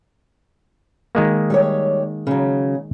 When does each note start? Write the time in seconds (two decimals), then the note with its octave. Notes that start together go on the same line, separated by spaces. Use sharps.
1.15 D#3 G#3 A#3
1.50 G3 G4 C#5
2.27 C#3 F#3